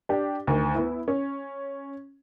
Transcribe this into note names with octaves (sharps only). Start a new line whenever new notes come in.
D4 G4
D2 D#3
B3 E4
C#4